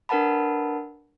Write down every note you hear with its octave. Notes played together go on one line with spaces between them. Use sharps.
D4 A#4 B4 F#5 A5 B5